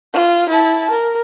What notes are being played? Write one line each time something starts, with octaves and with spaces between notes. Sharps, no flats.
F4
E4 A5
A#4